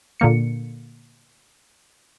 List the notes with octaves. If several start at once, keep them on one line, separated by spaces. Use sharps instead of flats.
A#2 D3 A#3 C#7